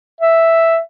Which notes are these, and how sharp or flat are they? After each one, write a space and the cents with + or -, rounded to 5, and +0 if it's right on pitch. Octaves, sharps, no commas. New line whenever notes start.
E5 +0